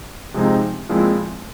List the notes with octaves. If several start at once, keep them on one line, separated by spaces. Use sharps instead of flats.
C3 F3 G#3 C4 D#4
A#2 F3 G#3 C4 E4